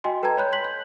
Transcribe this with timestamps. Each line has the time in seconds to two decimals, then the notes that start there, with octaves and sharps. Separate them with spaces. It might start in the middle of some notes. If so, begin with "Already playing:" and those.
0.04 F#4 D#5 G5 G#5 C6
0.22 A4 B4 G5 A5 A#5 G#6
0.37 C#5 B5 F#6 G6
0.52 C6 F#6 B6 F#7
0.64 G6